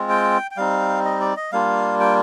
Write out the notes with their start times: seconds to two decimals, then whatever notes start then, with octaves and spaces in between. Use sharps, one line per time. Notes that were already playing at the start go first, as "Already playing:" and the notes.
Already playing: G#3 C4 F4
0.09 G5
0.51 G5
0.57 G3 C4 D#4 F5
1.05 D#5
1.21 D5
1.37 D#5
1.52 G3 A#3 D4 F4 F5
2.00 G5